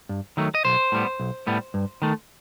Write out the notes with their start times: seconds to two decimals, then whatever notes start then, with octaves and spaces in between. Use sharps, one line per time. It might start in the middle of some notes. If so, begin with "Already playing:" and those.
0.09 G2
0.37 D#3 F#3 A3
0.55 D#5
0.65 B1 C5
0.92 A2 G3 B3
1.20 B1
1.47 A2 G3 B3
1.74 G2
2.02 D#3 A3